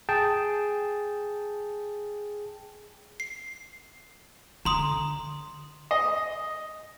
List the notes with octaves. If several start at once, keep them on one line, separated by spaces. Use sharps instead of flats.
G#4 G5 A5
C7
D3 A#5 C6 D#6
D#5